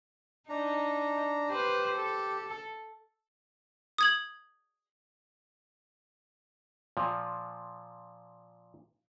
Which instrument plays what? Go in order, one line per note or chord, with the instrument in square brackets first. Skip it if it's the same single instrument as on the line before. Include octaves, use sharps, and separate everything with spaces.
[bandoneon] D4 A#5 [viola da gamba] D#4
[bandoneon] G4 [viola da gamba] B4 C5
[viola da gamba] A4
[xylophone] D#6 G#6 F#7
[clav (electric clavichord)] A#2 F3